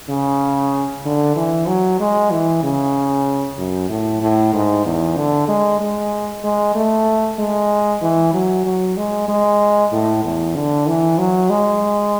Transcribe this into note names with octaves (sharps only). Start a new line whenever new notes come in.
C#3
D3
E3
F#3
G#3
E3
C#3
F#2
A2
A2
G#2
E2
D3
G#3
G#3
G#3
A3
G#3
E3
F#3
F#3
G#3
G#3
A2
E2
D3
E3
F#3
G#3